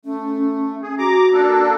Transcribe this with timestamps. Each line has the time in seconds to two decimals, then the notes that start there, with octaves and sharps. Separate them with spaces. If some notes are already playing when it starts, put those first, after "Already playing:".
0.05 A3 C#4
0.82 G#4
0.99 F#4 A#5 D6
1.33 A#3 D4 A4